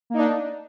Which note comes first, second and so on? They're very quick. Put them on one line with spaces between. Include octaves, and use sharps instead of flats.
A#3 D#4 D4